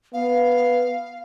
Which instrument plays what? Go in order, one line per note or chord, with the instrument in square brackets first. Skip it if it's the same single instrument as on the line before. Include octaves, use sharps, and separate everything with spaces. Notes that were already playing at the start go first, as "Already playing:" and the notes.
[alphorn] B3 [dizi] F5